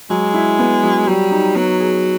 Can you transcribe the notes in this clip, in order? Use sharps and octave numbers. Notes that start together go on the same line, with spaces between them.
F#3 G#3
E4
B3
F#3
F#3 G3
D#4
F#3 B3
G#4